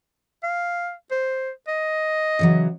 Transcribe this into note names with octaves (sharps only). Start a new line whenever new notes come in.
F5
C5
D#5
C#3 E3 F#3